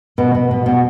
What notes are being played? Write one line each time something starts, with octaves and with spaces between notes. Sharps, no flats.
B2
B2
B2
B2